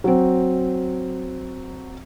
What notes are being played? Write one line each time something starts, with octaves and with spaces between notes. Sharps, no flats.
F#3 C4